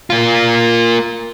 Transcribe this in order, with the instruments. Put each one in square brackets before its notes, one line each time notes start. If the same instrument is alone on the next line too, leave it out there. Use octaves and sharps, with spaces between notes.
[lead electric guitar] A#3 F4